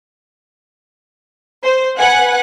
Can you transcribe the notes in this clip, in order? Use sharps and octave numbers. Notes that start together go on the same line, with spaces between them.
C5
B4 F#5 G#5 F#6